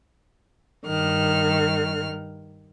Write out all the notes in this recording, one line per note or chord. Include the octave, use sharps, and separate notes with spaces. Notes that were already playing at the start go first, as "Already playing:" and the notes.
G2 D#3 F6